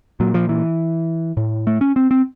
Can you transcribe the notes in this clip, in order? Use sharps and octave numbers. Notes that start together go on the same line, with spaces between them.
A#2 F#3
F3
E3
A2
A3
C#4
C4
C4